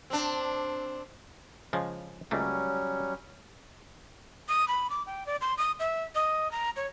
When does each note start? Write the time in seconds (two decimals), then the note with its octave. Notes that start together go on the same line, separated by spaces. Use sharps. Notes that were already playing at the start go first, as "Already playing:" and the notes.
0.10 C4 D4
1.73 C#3 F3 G#3
2.31 C#2 F#3 G3 A3 A#3 C#4
4.48 D#6
4.68 B5
4.90 D6
5.06 G5
5.26 D5
5.41 C6
5.58 D#6
5.80 E5
6.15 D#5
6.52 A#5
6.76 C#5